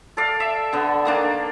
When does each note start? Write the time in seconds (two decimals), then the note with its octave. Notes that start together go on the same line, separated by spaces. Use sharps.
0.17 A4 D5 F5
0.40 E5
0.73 D3 B3
1.05 D#3 A#3 D4